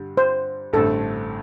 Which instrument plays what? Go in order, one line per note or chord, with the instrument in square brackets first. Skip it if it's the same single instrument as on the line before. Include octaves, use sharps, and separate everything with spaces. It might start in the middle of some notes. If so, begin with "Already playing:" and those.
Already playing: [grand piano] G2 D3 G3
[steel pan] C5
[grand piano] A1 G2 D3 A3 C4 [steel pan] A4